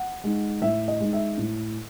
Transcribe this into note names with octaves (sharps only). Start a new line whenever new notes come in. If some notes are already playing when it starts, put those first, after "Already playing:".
Already playing: F#5
G#3 D#4
A2 E5
D#5
G#3 D#4
E5
A2